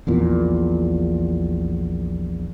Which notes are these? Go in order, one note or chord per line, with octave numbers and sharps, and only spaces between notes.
A#1 E2 A#2